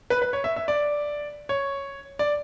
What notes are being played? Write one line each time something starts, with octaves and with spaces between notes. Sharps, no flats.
B4
B4
C#5
E5
E5
D5
C#5
D5